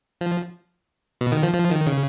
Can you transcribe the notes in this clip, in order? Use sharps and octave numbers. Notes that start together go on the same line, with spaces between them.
F3
B2
D#3
F3
F3
D#3
C#3